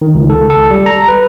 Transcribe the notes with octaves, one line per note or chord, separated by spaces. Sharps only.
D#3
C#2
A4
A4
G3
A#5
B4